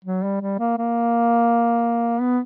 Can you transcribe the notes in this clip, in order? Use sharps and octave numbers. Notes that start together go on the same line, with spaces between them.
F#3
G3
G3
A#3
A#3
B3